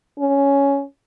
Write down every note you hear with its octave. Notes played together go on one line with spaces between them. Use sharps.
C#4